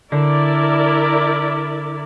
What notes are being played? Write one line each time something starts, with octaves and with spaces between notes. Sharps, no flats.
D3 E4 A#4 D5